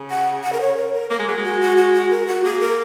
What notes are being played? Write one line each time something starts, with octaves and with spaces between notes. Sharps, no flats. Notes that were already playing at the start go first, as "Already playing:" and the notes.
Already playing: C#3
F#5
F#5
A#4
C#5
A#4
A#4
A#3 A#4
G#3
F#3 G#4
G#3
F#4
F#4
F#4
F#4
A#4
F#4
A#3 G#4
A#4